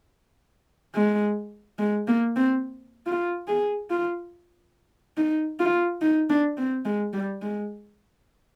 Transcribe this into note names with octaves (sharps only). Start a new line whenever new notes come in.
G#3
G#3
A#3
C4
F4
G#4
F4
D#4
F4
D#4
D4
C4
G#3
G3
G#3